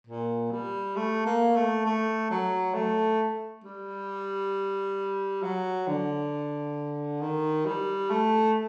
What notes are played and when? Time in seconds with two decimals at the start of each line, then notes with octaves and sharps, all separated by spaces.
0.07 A#2
0.52 G3
0.96 A3
1.26 A#3
1.56 A3
1.85 A3
2.30 F#3
2.74 A3
3.64 G3
5.43 F#3
5.87 D3
7.21 D#3
7.66 G3
8.10 A3